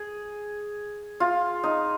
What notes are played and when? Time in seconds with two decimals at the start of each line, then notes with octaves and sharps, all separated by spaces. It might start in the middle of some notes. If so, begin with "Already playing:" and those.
Already playing: G#4
1.20 F4
1.64 D#4